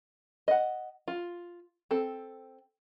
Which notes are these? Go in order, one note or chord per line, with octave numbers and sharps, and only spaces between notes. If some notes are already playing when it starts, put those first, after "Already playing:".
D#5 F#5
F4
C4 A4